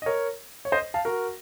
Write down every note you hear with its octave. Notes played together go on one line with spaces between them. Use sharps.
D#5
A#4 C#5
C#5
C5 D#5
F5 A5
F#4 A#4